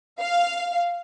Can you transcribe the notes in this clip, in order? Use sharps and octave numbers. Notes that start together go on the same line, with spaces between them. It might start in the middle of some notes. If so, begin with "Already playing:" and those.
F5